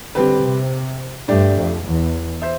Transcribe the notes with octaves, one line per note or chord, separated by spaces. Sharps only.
D3 G3 C4 G4 B4
C3
G2 A3 D4 G4 D5
F2
E2
C5 E5